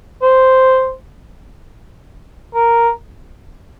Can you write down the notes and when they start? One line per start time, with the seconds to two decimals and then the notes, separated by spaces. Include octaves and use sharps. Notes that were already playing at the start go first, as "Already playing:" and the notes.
0.22 C5
2.54 A#4